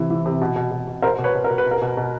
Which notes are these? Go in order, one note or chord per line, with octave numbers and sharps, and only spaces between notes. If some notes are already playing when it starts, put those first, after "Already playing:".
Already playing: C3 E3
E3
C3
B2
B2
B2
B2
B2 A#4 C5
B2
B4 C#5
B2
A#4
B2
B4
B2
A#4
B2
B2